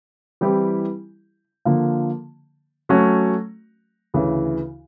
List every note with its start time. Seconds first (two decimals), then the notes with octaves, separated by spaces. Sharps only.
0.41 E3 G3 C4 E4 G4
1.65 D3 F3 A#3
2.89 F#3 A3 C#4 F#4
4.14 D2 C#3 E3